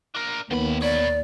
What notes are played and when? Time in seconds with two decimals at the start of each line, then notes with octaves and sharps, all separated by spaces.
0.15 D4 A#4
0.51 D#2 D#3 B3 A#4 B5
0.82 C#5 D5 B5